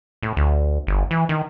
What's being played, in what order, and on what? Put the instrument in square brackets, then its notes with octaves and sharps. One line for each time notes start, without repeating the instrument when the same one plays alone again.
[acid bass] A2
D2
G1
E3
D#3